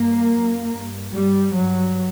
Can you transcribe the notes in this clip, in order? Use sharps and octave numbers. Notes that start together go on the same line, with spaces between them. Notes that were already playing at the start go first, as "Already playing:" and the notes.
Already playing: G2 A#3
F#2
G2
G2 G3
G2 F#3